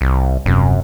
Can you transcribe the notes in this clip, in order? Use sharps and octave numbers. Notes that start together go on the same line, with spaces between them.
C2
D#1 F#2 C3